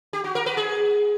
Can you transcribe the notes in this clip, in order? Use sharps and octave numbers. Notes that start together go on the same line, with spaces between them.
G4
F#4
A#4
B4
G#4